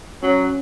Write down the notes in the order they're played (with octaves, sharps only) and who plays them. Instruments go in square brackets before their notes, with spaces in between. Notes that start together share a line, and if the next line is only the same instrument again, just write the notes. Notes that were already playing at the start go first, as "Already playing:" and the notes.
[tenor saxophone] F#3 [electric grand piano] C#4